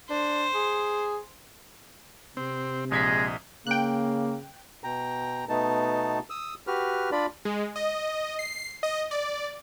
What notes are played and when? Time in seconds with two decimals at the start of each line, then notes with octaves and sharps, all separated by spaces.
0.10 D4 C5
0.54 G#4
2.37 C3 C4
2.92 A#1 G#3 D#5 G#6 B6
3.67 C#3 A#3 G5 F#6
4.84 B2 G5 A#5
5.49 B2 A3 B3 D#4 A5
6.30 D#6 E6
6.67 F#4 G4 B4 F6
7.12 D4 F4 D5 B5
7.45 G#3
7.76 D#5
8.39 C7
8.83 D#5
9.11 D5